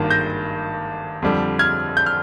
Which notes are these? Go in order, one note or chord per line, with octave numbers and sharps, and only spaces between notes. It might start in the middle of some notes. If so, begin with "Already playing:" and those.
Already playing: G#1 G2 D#3 A#3
G6 A#6
F2 D3 G3
F6 G#6
G6
F6